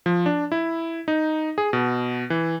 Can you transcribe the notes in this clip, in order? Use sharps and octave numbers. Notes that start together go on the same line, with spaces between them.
F3
D4
E4
D#4
G#4
B2
E3